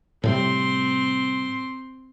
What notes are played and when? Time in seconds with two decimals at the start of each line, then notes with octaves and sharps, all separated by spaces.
0.24 A2 C3 G3 C4 C6